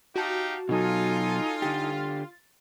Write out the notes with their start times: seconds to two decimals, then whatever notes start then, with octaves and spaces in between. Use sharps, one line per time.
0.16 D#4 F#4 G4 F5 A5
0.69 B2 F#3 D#4 F4 A4 G#5
1.62 D3 G4 A6